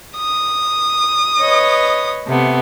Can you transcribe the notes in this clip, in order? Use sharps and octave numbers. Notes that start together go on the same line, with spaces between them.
D#6
B4 C#5 D#5
C3 A3 B3